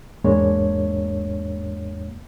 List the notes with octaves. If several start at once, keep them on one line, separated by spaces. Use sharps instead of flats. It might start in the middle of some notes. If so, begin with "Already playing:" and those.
E2 G#2 G#3 A#3 D4 C#5